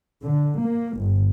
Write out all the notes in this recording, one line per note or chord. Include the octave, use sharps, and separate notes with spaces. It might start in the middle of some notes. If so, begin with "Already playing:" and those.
D3
A#3
G1